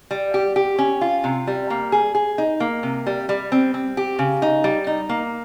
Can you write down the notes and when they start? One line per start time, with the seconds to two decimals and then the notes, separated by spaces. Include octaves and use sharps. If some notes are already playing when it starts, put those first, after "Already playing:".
0.11 G3
0.34 G4
0.56 G4
0.79 C#4
1.01 F4
1.24 C3
1.47 G3
1.70 A#3
1.92 G#4
2.15 G#4
2.38 D#4
2.60 A#3
2.83 C3
3.07 G3
3.29 G3
3.52 C4
3.74 C4
3.97 G4
4.19 C#3
4.42 D#4
4.64 G3
4.87 D#4
5.09 A#3